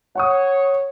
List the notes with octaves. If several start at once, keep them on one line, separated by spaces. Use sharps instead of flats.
C#5 F#5 C#6 D#6